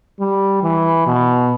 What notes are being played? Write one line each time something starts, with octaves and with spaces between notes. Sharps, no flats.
G3
E3
B2